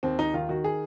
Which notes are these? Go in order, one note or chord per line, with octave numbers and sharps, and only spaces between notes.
D#2 C4
D#2 D#4
D#3 F4
D#3 F#4
G#4